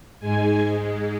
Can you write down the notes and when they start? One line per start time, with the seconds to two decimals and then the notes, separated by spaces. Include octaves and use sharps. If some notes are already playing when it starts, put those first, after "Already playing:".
0.20 G#2 G#3 G#5
0.59 G#2 G#3